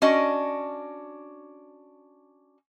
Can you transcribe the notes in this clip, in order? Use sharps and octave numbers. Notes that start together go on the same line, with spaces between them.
C#4 D4 F#4 D#5